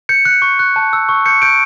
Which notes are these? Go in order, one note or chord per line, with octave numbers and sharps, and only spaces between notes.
G6 C#7
F#6 C#7
C#6
F#6
A5
E6
C#6
G6 C#7
G6 D7